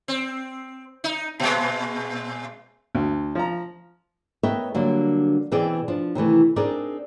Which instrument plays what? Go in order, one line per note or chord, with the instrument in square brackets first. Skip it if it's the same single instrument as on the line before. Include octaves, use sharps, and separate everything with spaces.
[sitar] C4
D#4
A#2 G#3
[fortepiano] D2
F3 A#5
[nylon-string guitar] B3 A#4 C#5 D#5 E5 G5
D3 F#3 G3 A#3 D4
B2 E3 C4 G#4 D5 G5
F3 D4
C3 D#3 E3 A3
C4 D4 D#4 G#4 A#4 D5